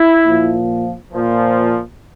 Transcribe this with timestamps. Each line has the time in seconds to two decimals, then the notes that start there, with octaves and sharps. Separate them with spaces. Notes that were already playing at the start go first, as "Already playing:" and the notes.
Already playing: E4
0.25 A#2 F3
1.11 A#2 F3